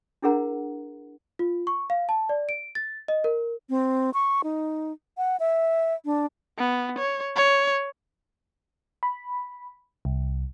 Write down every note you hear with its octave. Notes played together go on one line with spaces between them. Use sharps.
D4 E4 G#4 A#4 F#5 A#5
F4
C#6
F5
A5
D5
D7
A6
D#5
A#4
C4
C#6
D#4
F#5
E5
D4
B3
C#5
C#5
B5
C2